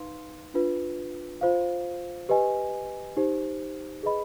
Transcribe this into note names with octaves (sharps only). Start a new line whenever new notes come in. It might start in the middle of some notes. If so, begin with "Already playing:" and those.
Already playing: D#4 B4 F5 C6
D4 F4 B4
F4 C5 F5
G4 B4 D#5 G#5
D#4 G4 C5
G#4 B4 D#5 B5